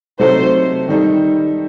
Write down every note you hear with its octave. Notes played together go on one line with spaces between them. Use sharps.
C3 F#3 A3 D#4 A4 C5
D#3 G3 D#4 A4